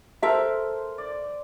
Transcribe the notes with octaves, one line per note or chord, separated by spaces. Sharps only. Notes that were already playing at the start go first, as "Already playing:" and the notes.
A4 A#4 C5 E5
D5